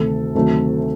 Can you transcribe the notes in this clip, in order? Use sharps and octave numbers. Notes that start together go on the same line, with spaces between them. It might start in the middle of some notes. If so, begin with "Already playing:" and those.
Already playing: D2 C3 D#3 A3 A4
D2 C3 D#3 F#3 A3